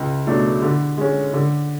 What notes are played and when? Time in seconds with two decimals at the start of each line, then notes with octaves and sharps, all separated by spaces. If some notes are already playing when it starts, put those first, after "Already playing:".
Already playing: C#2
0.26 B2 F#3 A3 D4
0.62 D3
0.97 G#3 C#4
1.33 D3